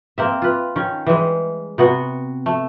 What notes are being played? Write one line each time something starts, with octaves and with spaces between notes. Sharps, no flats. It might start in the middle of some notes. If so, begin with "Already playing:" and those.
A#3 C4 E5
F4 B4
D#3 C#4
E3 G3 G#3
C3 B3 F#4
A3